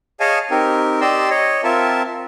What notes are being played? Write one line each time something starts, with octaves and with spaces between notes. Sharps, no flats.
G#4 C#5 D#5 F5 G#5 A5
C4 D#4 G4 A#4
G4 D5 D#5 C6 E6
C#5 D#5
C4 F4 A#4 E5 A5